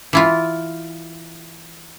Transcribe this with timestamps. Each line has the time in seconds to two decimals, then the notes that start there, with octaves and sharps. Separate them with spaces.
0.13 E3 E4 F4